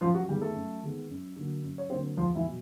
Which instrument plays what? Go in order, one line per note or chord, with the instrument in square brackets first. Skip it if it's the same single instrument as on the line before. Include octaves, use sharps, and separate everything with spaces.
[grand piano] F#2 F3 F4
F#3 F#4
D#3 G3 G#3 B3 G4
A3 A4
F#2
D#3 G#3 B3
F#2
D3 F#3 A#3
F#2
C#5
D3 F#3 A#3 C4 C5
E2 F3 F4
E3 E4
B2 F#3